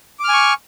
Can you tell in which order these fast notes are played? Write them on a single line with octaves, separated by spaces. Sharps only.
D6 F6 G#5 C#6